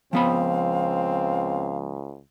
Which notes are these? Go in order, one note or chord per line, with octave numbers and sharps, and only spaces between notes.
C#2 F3 B3 C4 F5 B5